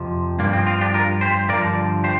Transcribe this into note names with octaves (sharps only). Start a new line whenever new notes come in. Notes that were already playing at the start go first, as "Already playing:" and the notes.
Already playing: F2 C3 F3
G2 F3 A#3
C4
C4 F4
D4 G4
F4 A#4
G4 C5
G2 D3 F3 A#4 D5
G4 C5